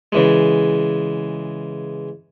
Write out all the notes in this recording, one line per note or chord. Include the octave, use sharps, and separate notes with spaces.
C#3 E3 G#3